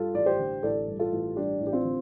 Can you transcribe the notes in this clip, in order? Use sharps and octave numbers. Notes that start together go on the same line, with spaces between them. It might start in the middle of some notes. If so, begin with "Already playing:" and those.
Already playing: G2 F4 A4
A1 D5
G4 C5
D3
A1 A4 D5
G2
F4 A4
A1
G2 D4 G4
A1
G4
C4 F4
D3